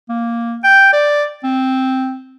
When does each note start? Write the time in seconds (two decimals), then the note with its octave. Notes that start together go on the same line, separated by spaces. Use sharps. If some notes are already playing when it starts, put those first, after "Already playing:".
0.09 A#3
0.64 G5
0.93 D5
1.43 C4